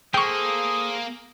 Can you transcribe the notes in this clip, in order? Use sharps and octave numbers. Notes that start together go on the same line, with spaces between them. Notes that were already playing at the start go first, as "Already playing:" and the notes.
A#3 G#4 A4 C5 G5 C#6 D#6